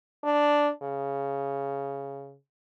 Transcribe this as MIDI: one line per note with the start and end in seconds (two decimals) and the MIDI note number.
0.24 0.69 62
0.82 2.36 49